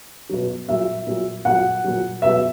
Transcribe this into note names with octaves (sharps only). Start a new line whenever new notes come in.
B2 F#3
A#2 F#3 E5
A#2 F#3
A#2 F#3 F#5
A#2 F#3
B2 F#3 E5